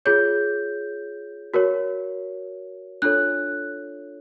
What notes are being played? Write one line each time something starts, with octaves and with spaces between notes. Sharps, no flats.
F4 G#4 C#5 G6
F#4 A#4 C#5
D4 F4 A4 C#5 F#6